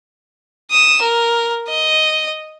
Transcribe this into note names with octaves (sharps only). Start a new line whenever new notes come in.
D#6 E7
A#4
D#5